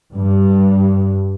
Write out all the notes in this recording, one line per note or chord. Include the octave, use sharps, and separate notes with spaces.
G2